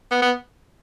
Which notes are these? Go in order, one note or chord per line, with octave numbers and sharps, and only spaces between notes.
B3
B3